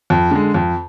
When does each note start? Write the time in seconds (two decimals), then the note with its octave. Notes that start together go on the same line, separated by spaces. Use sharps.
0.10 F2
0.31 D3 G#3
0.54 F2